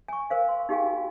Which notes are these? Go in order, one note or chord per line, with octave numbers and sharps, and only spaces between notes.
G#5 C#6
A#4 C5 F5
C6
D#4 G4 G#4 F5 G5 G#5
F#4